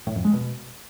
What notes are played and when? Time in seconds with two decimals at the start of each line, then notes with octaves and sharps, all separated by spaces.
0.07 A2
0.16 F2
0.25 G#3
0.33 B2